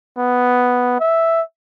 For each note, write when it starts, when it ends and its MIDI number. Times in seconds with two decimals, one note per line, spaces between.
0.18 0.95 59
1.00 1.41 76